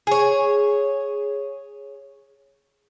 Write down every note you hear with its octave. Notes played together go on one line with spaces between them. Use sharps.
G#4 C#5